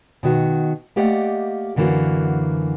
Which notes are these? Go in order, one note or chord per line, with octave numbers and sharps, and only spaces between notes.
B2 D#3 F#4
A3 A#3 G4 D5 D#5 F#5
F#2 D3 E3 A#3 F#4